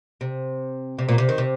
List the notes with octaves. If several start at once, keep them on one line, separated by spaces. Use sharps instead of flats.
C3
C3
A#2
C3
D#3
C3